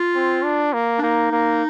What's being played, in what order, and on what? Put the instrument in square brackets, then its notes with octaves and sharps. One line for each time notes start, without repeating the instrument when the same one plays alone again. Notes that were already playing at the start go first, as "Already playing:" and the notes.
Already playing: [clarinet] F4
[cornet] C4
D4
A#3
[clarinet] D4
[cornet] A#3 [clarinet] D#4
[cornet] A#3